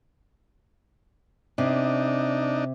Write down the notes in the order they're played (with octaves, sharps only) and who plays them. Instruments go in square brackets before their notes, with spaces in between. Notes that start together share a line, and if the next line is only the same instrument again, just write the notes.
[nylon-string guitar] C3 [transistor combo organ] D4 D#4